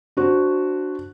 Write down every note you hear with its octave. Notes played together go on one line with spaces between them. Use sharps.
D4 F#4 C5